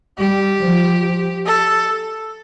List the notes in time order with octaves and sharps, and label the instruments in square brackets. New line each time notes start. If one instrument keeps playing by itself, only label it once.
[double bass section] G3 [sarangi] G4
[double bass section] F3
[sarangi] A4